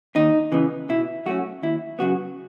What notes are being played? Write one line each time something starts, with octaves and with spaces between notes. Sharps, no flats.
D#2 D#4
C#3 E3 B3
B2 E4
F#3 A3 C#4 F#4
D#2 E4
C#3 F#3 B3 F#4